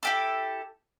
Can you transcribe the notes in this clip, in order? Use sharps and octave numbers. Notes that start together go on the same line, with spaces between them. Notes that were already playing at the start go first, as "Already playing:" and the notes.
E4 G4 A4